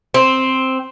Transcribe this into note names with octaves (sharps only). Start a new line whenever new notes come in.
C4